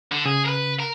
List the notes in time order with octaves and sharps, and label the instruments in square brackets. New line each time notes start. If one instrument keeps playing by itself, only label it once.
[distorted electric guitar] D3
[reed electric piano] C#3 [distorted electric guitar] G#4
[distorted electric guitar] A#4 B4
A#4